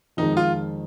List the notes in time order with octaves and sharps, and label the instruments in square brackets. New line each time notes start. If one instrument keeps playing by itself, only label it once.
[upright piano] F2 D#3 G#3 [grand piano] D#4
[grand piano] F4